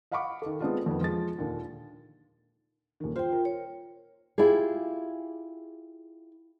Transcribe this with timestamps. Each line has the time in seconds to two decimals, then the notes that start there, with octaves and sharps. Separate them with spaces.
0.11 D#5 F5 F#5 B5 C#6 D6
0.42 D#3 A4
0.60 G#3 B3 C4 D4 D#4 F4
0.86 F2 D#3 B3
1.01 F3 G#3 A6
1.38 D#2 A#2 D3
3.00 D#1 D#3
3.16 F4 C5 G5
3.32 A#4
3.45 C#5
4.38 E4 F4 G4 G#4